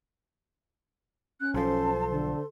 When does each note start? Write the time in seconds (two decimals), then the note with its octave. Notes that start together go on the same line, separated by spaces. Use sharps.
1.40 C#4 F#6
1.54 B1 F3 A4 C5 A5 C6
2.10 D3 A5